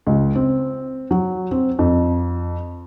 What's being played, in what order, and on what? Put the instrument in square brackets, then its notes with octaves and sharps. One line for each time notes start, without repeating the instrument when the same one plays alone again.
[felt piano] C#2
C4
F#3
C4
F2